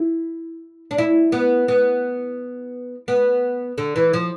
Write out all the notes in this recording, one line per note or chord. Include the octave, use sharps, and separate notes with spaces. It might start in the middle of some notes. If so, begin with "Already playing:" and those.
Already playing: E4
D4
E4
B3
B3
B3
D3
E3
F3